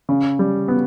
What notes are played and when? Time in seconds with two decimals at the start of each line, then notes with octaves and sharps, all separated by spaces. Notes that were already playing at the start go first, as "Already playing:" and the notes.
0.09 C#3
0.39 G3
0.68 B3